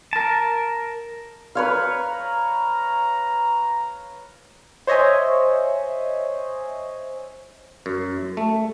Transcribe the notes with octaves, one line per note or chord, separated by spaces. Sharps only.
A#4 A5
B4 C#5 F5 A#5
C5 C#5 D#5 E5 G#5
F#2
A3